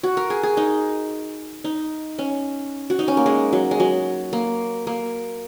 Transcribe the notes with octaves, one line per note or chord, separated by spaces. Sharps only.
F#4
A#4
G#4
G#4
D#4
D#4
C#4
F#4
D#4
C#4
A#3
G#3
F#3
G#3
F#3
A#3
A#3